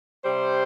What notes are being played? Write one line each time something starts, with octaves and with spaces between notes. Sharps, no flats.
C3 G3 C5